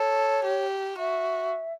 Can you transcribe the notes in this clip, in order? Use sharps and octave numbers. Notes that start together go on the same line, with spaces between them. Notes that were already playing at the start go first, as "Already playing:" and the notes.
Already playing: A4 C#5
G4
F#4 E5